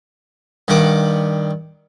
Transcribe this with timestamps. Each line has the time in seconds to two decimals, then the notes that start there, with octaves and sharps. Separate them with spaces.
0.68 G2 D#3 F#5 D6